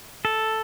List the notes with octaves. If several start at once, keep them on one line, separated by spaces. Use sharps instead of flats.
A4